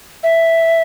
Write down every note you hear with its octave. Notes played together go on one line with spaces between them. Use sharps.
E5